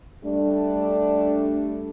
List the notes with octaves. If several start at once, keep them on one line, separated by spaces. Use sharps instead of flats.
G3 A3 D4